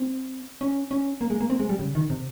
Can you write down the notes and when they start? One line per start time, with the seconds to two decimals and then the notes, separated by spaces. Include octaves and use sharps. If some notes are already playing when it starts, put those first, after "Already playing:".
Already playing: C4
0.61 C#4
0.91 C#4
1.21 A#3
1.30 G#3
1.41 A#3
1.50 C4
1.60 G#3
1.69 G3
1.79 C#3
1.95 D#3
2.10 C3